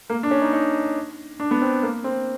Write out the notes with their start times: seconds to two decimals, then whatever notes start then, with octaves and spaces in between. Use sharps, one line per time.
0.10 A#3
0.23 D4
0.31 C#4
0.42 D#4
0.53 D#4
1.40 D4
1.51 B3
1.62 C4
1.83 A#3
2.04 C4